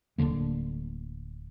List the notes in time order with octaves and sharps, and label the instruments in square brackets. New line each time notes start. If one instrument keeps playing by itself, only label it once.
[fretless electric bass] D1 C#2 D3 A#3